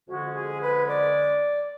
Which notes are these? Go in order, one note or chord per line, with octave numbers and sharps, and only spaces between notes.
F2 D3 G#3 C#4 F#4
G#4
B4
D5